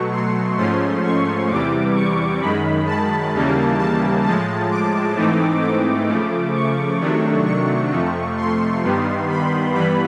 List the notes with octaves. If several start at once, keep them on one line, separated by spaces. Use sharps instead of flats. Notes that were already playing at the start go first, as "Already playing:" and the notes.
Already playing: B2 F#3 A3 C#6
C6
G#2 F3 A3 C#4 C6
C#6
E2 C3 E3 G3 D6
C#6
F#2 D#3 G#3 B5
A5
D#2 C#3 E3 G3 A#3
A5
A2 F3 G#3 A5
D6
G#2 E3 A3 C4 D#4
D6
C#3 F3 A3
C#6
C3 D#3 F#3 A3 D4
C#6
F2 C3 F3 A3
C6
G2 D#3 G3 B3
B5
G2 E3 G3 B3 B5